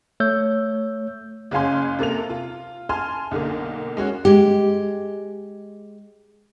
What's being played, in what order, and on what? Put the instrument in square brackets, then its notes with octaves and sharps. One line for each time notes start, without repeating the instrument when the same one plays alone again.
[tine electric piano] A3 C#5 E6 G6
[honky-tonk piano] F#1 C#3 C#4 F5 G#5 C6
C3 A#3 A4 F7
F4
G#5 A5 C6 F6
B1 D3 A#3
G#3 C#4 F#4
[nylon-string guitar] G#3 G4